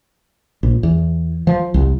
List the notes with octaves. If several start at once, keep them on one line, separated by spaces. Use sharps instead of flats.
A#1
E2
F3
C2